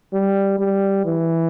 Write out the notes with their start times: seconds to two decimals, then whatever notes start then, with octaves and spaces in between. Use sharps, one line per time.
0.13 G3
0.58 G3
1.05 E3